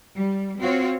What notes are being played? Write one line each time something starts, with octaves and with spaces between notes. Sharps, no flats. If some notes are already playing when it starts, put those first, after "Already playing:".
G3
C4 F4 F#4 C#5